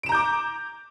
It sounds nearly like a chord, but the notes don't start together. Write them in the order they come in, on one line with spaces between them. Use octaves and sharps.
D7 E7 A#5 G6 D6